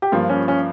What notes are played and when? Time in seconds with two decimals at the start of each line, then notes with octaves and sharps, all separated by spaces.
0.02 G4
0.12 G2 F3 A#3 F4
0.29 C#4
0.48 C#4